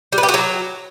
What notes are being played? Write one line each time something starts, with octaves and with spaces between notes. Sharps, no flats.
G3
B4
G4
F#4
F#3